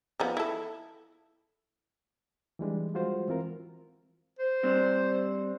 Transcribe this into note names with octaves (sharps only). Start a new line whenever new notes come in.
F3 B3 D#4
E4 A4
E3 G3 G#3 D4
F3 G3 G#3 F4 F#4 C5
E3 C4 F4 A#4
C5
G3 C4 D4